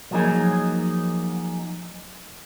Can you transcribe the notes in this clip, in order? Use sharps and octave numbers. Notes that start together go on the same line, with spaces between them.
F3 F#3 A#3 D#4 G#4